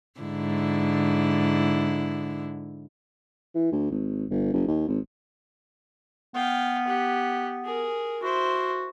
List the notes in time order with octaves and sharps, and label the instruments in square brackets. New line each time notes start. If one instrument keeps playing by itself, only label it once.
[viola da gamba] G#2 D3 E4
[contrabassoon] E3
D2
G#1
G1
F#1
D#2
G#1
[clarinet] B3 [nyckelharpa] F5 G5
[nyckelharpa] G4 F#5
G#4 A#4
[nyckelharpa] E4 C5 [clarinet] F#4